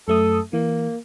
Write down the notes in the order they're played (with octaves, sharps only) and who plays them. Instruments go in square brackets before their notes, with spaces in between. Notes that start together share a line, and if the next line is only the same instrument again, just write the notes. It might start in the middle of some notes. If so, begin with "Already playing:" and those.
[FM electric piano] F#2 A3 D#6 [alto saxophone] A4
[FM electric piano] E3 [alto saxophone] A#3